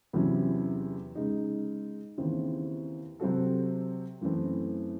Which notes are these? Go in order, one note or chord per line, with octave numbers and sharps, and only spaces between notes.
E2 C3 F#3 C#4 E4
C#3 G#3 D#4
D#2 C#3 E3 C4
C3 F#3 C4 F#4 A4
F#2 E3 A3 C4